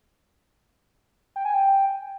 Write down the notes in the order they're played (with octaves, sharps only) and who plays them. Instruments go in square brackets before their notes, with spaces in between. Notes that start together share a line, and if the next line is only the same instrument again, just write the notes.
[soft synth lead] G5
G#5
G5